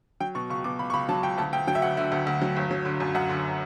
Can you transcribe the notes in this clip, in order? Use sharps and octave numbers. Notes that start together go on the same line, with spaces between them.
F#3 G5
B2 C#6
C#2 C#6
B2 D6
C#2 B5
C#6
C#2 B5
F#3 A5
C#2 G5
D2 A5
D2 G5
F#3 G5
E5
D2 F#5
D3 E5
D2
D2
F#3
G1
F#3
D3
F#2
F#2 F#5
D3